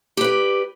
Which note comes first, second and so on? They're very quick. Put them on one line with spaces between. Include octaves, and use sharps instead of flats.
G4 B4 D5